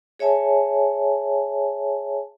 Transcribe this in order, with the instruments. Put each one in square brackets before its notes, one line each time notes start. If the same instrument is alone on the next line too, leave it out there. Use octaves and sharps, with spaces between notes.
[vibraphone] G#4 C#5 E5 G#5 A5